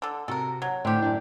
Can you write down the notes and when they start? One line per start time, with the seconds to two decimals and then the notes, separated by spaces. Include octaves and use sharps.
0.02 D3 A4
0.28 C3 F#4 A4 A#4
0.62 F#3
0.85 A2 D3 C4 G4
1.02 F#2 D3 D4